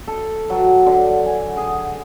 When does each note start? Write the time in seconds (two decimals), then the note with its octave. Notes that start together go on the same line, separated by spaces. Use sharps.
0.08 A4
0.50 F#3
0.86 D3
1.26 G#5
1.57 G#4